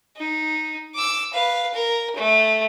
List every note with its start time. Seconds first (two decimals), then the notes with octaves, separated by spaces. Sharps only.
0.17 D#4
0.95 D6 E6
1.33 B4 F5
1.74 A#4
2.16 A3